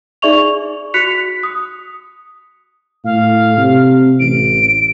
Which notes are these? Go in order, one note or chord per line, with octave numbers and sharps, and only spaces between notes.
D#4 G#4 D5 E5 C#6 F7
F#4 F#6 B6 C#7 F7
D#6
A2 F5
C3
A1 D7